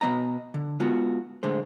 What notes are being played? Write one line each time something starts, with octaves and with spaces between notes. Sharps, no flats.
B2 G#3 B3 D#5 A#5
D3
G#3 B3 F4 F#4
A2 D3 G#3 C5